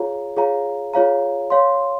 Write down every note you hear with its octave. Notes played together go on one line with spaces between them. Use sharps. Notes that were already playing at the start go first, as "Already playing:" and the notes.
Already playing: F4 G#4 C#5 F5 A#5
F4 G#4 C#5 F5 A#5
F4 G#4 C#5 F5 A#5
C#5 F5 C6